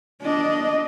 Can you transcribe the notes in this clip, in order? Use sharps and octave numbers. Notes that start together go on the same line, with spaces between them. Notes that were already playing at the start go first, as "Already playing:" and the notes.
D4 D#5